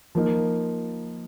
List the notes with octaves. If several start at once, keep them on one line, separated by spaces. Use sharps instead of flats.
F3 A#3 D#4